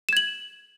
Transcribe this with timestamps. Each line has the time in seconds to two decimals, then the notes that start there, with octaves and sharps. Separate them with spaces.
0.09 E7
0.13 G#6
0.17 F#7